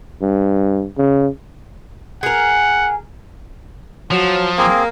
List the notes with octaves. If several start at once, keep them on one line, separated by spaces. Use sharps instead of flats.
G2
C#3
G#4 A#4 F#5
F3 F#3
A#3 C4 G#4